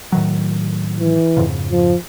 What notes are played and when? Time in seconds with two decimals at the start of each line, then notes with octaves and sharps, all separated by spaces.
0.12 A2 D#3 F#3
0.99 E3
1.37 F2 G#2 C#3
1.71 F3